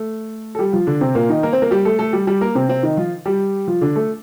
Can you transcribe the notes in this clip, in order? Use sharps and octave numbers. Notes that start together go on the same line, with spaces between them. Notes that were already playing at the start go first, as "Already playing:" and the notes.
Already playing: A3 A4
A4
G3 G4
F3 F4
D3 D4
C3 C4
A#2 A#3
D#3 D#4
A#3 A#4
C4 C5
A#3 A#4
G3 G4
A3 A4
A3 A4
G3 G4
G3 G4
A#3 A#4
C3 C4
C3 C4
D#3 D#4
F3 F4
G3 G4
F3 F4
D3 D4
A3 A4